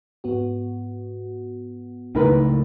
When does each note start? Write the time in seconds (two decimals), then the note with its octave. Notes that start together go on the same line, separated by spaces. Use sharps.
0.24 G#2 B3 F#4
2.15 C#2 A2 D#3 A#4 B4